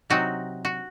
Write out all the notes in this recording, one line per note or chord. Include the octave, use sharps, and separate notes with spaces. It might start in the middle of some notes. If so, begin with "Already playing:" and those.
C3 F#3 C4 D#4 F#4
F#4